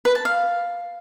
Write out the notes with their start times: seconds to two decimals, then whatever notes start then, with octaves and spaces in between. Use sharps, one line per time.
0.05 B4
0.15 A5
0.25 F5